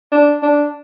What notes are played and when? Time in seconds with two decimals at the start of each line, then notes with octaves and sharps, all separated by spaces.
0.12 D4
0.43 D4